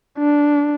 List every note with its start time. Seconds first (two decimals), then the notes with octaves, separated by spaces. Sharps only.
0.19 D4